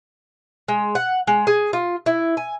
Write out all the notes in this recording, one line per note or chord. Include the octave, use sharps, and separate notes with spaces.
G#3
F#5
G#3
G#4
F4
E4
G#5